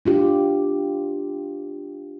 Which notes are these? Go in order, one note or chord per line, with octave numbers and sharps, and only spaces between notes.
D4 F4 G4